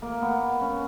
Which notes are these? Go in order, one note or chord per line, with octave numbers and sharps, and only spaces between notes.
A#3
B3
B3
C#4